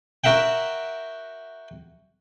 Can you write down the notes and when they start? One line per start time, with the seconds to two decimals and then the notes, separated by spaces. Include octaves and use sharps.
0.24 F#4 A#4 E5 F#5 G5